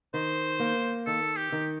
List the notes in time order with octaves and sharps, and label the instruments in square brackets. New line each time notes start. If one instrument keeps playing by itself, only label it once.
[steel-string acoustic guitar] D#3 [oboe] C5
[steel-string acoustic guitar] A#3
[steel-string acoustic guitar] D#3 [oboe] A4
[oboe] G4
[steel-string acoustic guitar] D#3